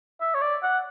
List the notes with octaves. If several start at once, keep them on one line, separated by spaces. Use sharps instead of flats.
E5
C#5
D5
F#5